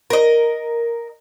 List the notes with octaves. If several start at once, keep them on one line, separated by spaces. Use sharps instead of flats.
A#4 D#5